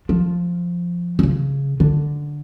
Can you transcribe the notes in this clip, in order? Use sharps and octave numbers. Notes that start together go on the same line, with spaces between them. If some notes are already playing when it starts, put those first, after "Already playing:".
F3
D3
C#3
D3